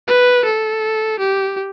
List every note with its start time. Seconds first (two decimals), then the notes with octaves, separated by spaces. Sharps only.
0.08 B4
0.45 A4
1.19 G4